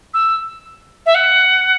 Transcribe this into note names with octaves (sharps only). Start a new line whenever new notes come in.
E6
E5
F#5